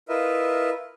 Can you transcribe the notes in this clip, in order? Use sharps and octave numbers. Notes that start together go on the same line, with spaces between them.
E4 F4 A#4 B4 D#5 E5